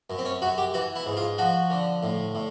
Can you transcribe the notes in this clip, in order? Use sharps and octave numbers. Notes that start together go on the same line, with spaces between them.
F#2
C4
C#4
F#2 F#4
G4
E3 F#4
E4
G#2
F4
F3 F#4
D3
A2
A2